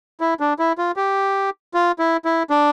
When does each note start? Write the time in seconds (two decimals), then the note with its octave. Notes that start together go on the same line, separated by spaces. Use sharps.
0.21 E4
0.40 D4
0.59 E4
0.78 F4
0.96 G4
1.74 F4
1.99 E4
2.25 E4
2.50 D4